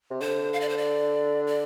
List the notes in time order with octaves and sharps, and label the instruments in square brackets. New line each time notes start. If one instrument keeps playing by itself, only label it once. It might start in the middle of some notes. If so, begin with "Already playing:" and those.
[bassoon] C3
[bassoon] D3 [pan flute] C5
[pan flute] F5
D5
C5
D5
D5